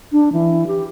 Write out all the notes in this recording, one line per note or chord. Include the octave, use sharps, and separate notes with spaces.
D4
E3
G4